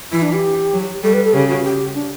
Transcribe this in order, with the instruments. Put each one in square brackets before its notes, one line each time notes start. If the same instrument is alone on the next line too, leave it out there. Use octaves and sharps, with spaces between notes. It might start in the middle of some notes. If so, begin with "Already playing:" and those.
[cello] E3 [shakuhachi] E4
[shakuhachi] D4
G4
[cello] F#3
[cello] G3 [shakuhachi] A4
[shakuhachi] B4
A4
[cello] C#3 [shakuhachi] G4
[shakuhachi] F#4
G4
D4